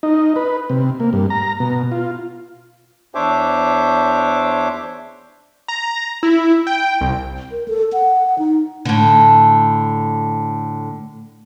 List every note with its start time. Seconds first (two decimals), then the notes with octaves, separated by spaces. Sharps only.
0.03 D#4
0.36 B4
0.70 C3
1.00 A#3
1.13 G2
1.30 A#5
1.60 B2
1.92 F4
3.15 E2 D4 C5 C#5 E5 D6
5.68 A#5
6.23 E4
6.67 G5
7.01 C2
7.52 A#4
7.68 A4
7.93 F#5
8.39 D#4
8.85 A2 D3